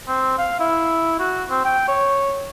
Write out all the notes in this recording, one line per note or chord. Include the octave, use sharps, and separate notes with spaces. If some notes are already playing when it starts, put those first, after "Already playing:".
C4
F5
E4
F#4
C4
G5
C#5